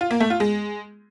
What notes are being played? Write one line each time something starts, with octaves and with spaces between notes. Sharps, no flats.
F4
A#3
A3
F4
G#3